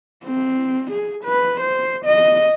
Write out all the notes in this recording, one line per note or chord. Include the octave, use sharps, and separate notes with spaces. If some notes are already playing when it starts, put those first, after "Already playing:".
C4
G#4
B4
C5
D#5